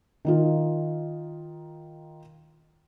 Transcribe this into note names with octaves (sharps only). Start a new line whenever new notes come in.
D#3 D#4 F4